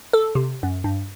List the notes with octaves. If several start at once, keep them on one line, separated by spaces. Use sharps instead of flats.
A4
C3
F#2
G2